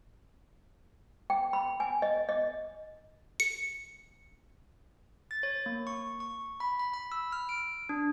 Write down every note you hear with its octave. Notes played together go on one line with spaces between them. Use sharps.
G5
B5
G#5
D#5
D#5
C#7
A6
C#5
A#3
C#6
C#6
B5
B5
B5
E6
F6
D7
D4